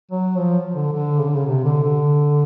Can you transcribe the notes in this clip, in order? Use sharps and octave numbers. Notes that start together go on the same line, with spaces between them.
F#3
F3
D3
D3
C#3
D3
C#3
C3
D3
D3